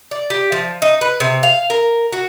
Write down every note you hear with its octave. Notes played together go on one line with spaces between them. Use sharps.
D5
G4
F3
D#4
B4
C3
F5
A#4
F#4